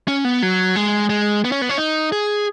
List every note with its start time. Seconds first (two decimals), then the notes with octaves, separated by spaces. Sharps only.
0.08 C#4
0.25 B3
0.42 F#3
0.76 G#3
1.10 G#3
1.45 B3
1.52 C#4
1.62 B3
1.69 C#4
1.78 D#4
2.12 G#4